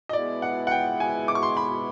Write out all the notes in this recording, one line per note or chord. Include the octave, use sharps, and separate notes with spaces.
D#5
B2 G#3 B3 E4 D5
F#5
F#5
G5
G#5
D6
C#6
C6
B5